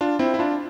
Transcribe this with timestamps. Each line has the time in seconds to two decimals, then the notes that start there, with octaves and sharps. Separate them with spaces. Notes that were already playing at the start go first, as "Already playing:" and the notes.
0.01 D4 F4
0.19 C4 E4
0.34 E4
0.39 D4 F4